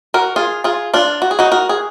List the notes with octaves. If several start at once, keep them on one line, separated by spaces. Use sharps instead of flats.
F#4 A#4
F4 G#4
F4 G#4
D4 F4
F#4
G#4
D#4 F#4
F#4 A#4
G#4